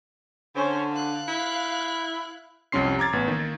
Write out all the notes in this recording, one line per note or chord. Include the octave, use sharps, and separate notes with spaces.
D3 C#4 C5
F5 F#6
E4
C2 F2 G3 C#4 C6 C7
A#5 D6 G#6 A6
A1 B3
D#3 A#3